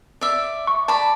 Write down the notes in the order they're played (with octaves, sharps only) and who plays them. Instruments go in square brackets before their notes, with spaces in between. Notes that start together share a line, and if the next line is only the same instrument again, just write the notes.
[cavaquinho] D5 E5
[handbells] C#6
[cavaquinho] D5 B5 [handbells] A5